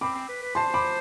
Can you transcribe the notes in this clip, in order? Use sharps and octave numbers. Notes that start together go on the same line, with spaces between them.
C4 B5 D6
C4
B4
B4
C5 A5 C6
B5 D6